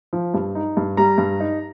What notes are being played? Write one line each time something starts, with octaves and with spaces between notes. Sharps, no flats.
F3
G2
D#4
G2
G3 A#5
G2
D#4